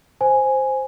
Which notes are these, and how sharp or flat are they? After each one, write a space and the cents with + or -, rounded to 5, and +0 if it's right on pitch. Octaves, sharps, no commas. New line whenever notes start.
C5 +0 G#5 +0